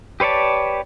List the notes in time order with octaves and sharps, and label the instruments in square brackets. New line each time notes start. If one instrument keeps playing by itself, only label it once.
[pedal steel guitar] G4 B4 C#5 D5 A5